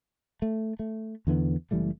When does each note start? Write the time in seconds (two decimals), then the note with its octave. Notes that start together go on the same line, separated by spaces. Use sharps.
0.42 A3
0.79 A3
1.27 E2 D3 E3 B3
1.71 F#1 E3 G3 A3